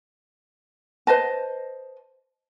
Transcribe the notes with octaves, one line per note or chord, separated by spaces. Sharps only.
B4 C5 D#5 A5